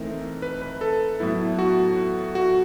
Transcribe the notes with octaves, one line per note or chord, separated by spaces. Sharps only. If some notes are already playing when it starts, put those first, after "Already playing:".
Already playing: E3 A3 C4 D#4 A#4
B4
B4
A4
A2 F#3 B3 E4
F#4
F#4